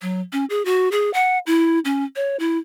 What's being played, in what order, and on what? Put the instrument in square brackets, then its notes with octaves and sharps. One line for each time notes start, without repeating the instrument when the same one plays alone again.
[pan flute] F#3
C#4
G#4
F#4
G#4
F#5
E4
C#4
C#5
E4